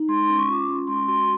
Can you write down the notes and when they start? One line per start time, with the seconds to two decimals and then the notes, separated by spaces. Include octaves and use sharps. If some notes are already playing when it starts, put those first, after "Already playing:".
Already playing: D#4
0.08 G#3 C6
0.23 C6
0.29 C#4
0.38 C#6
0.48 F4 D6
0.68 C#4
0.87 G#3 C6
1.07 F#4 C6